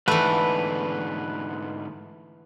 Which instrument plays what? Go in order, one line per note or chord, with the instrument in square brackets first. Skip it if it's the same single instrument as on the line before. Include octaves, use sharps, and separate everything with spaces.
[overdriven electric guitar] G#2 D3 [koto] E3 A3 [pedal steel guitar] B4 F#5